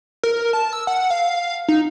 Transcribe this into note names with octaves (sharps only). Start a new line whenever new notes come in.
A#4
A5
E6
F#5
F5
D#4